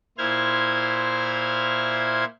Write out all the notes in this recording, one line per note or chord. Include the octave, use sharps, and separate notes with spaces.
A#2 E4 C5 F6 G#6